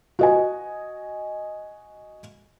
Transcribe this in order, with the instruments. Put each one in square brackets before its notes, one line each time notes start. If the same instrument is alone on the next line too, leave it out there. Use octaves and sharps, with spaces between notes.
[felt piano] F#4 D#5 G#5